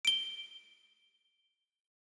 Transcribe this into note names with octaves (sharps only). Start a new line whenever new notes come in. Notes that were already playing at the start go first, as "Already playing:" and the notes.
D7 G7